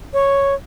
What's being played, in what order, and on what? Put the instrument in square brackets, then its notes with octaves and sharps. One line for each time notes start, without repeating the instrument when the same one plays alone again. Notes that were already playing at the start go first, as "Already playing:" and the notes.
[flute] C#5